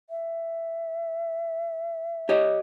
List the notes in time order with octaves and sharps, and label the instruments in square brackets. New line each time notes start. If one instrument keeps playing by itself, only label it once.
[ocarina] E5
[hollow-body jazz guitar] G4 C#5 D#5